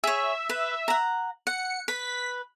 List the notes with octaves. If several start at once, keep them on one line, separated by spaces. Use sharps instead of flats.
G#4 C#5 E5
B4
F#5 A#5
F#5 C#7
B4 B6